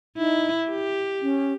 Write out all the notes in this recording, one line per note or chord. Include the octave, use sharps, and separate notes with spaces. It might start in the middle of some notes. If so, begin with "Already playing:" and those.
D#4 E4
G4
C#4